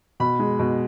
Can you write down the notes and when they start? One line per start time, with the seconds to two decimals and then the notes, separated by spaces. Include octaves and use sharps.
0.20 B2 B5
0.39 G#3
0.59 B2